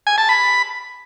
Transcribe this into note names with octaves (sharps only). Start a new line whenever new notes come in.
G#5
A5
B5